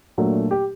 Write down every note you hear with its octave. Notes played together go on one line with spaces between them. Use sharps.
A#2 F#3 A3 D4 F#4
G4